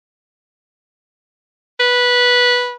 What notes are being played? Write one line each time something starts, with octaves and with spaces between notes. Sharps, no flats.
B4